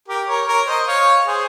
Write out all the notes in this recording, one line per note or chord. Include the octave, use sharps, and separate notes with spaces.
G4 A#4
A#4 C#5
A#4 C#5
C5 D#5
C#5 F5
G#4 C5